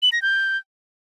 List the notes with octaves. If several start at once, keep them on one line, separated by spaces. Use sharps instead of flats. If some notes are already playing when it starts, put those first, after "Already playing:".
F#7
A#6
G6